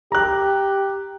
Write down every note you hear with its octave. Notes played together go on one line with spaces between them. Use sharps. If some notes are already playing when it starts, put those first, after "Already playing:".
G4 A#5 F#6